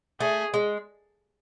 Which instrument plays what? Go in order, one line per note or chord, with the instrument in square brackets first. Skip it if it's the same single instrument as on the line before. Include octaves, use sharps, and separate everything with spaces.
[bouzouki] A3 [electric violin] G#4
[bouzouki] G#3